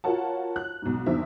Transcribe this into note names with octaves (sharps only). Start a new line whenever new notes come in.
F4 F#4 A#4 C#5 F#5 A5
F#6
B1 G#2
E2 G2 D#3 C5 E5